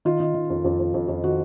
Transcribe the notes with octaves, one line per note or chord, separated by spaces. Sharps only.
D#3 F4
D#3
D#3
F2
F2
F2
F2
F2
D#3 F#4